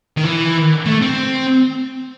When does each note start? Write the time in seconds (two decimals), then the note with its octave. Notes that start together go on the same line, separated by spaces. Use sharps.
0.17 D#3
0.24 E3
0.86 A3
1.01 C4